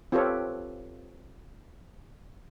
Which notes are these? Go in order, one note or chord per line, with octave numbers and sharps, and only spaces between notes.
C4 F4 G4 A4 B4 C#5